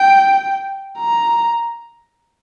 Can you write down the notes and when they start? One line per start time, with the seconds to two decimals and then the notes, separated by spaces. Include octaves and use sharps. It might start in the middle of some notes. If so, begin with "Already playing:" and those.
Already playing: G5
0.98 A#5